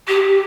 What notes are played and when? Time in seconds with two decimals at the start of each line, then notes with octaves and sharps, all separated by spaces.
0.07 G4